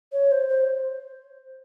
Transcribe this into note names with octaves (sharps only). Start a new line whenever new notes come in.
C#5
C5
C5